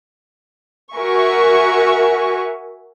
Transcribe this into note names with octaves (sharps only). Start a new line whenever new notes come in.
F#4 A#4 E5 G#5 C#6